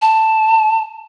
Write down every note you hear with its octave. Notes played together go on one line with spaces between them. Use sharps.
A5